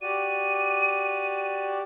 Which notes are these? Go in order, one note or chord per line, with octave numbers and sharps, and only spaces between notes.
F#4 G4 D5 D#7